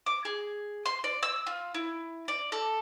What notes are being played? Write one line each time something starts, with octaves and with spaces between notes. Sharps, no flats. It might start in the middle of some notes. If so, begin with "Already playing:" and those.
D6
G#4
C6
D5
E6
F4
E4
D5
A4